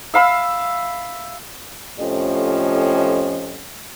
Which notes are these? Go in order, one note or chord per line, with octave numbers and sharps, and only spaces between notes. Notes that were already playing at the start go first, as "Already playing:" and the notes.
E5 F5 B5 E6
F2 A2 F3 C#4 G4 D#5